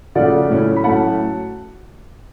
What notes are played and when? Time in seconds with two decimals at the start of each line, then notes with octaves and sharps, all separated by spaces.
0.15 C#3 F3 A3 D5 F#5
0.50 A2 F#3 A3 C#4
0.76 B5
0.83 A2 F#3 A3 C#4 F#5 A5